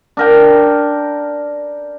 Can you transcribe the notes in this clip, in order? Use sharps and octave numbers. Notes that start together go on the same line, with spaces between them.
D4 A#4 G5